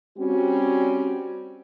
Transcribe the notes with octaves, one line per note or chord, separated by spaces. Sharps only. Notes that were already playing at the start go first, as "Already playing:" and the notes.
G3 C4 C#4 F#4